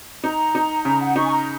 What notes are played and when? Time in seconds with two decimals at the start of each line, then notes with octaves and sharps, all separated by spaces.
0.23 D#4 A#5
0.55 D#4
0.85 C#3 A#5
1.01 F#5
1.16 D#4 C#6
1.25 G#5
1.32 A#5